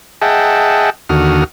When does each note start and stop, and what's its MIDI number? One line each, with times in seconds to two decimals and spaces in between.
0.22 0.90 68
0.22 0.90 75
0.22 0.90 76
0.22 0.90 78
0.22 0.90 79
0.22 0.90 81
1.09 1.44 39
1.09 1.44 50
1.09 1.44 66
1.09 1.44 87
1.09 1.44 89